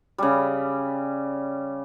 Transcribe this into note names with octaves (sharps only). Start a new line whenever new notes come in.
C#3 G3